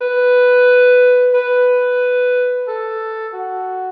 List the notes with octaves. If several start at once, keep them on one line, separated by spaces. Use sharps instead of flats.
B4
B4
A4
F#4